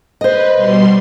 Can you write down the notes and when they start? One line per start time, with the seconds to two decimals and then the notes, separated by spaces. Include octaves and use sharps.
0.21 B4 C5 D#5
0.55 B2 G3 C6